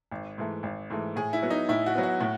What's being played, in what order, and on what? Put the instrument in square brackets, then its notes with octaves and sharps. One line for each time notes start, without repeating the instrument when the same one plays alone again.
[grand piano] G#1
G#2 E3 A3
G#1
G#2 E3 A3
[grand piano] A2 [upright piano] G#4
[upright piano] E4
[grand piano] F#3 B3
[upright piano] D#4
[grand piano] A2 [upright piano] E4
[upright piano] F#4
[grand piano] F#3 B3
[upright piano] F#4
[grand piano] A2 [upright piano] F#4